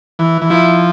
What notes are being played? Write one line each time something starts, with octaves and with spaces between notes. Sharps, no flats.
E3
E3
F3 E4